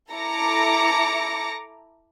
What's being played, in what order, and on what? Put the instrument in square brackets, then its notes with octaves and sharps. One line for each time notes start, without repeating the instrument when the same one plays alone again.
[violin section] E4 A4 A#5 D6 A#6 C#7